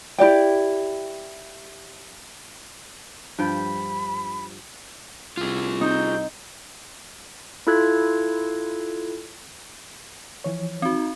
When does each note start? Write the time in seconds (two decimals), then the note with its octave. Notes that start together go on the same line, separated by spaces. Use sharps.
0.18 E4 G4 D5 G5
3.39 G2 F3 G5 B5
5.37 C2 F4 G#4
5.81 C4 D#4 G6
7.67 E4 F4 A4 F#6 G#6
10.44 E3 F3 C#5
10.82 C4 D#4 F#4